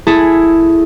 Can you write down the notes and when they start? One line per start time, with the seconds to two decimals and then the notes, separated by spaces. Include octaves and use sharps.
0.07 E4 G#4 A4